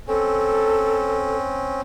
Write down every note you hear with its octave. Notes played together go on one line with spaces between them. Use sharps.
C4 C#4 A4